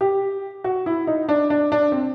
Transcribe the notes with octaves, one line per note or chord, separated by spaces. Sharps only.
G4
F#4
E4
D#4
D4
D4
D4
C4